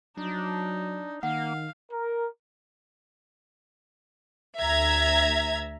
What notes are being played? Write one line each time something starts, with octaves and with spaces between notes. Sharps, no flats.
F#3 D4 D#4
D#3 A#3 F5 F#5
A#4
D2 E5 A#5 G#6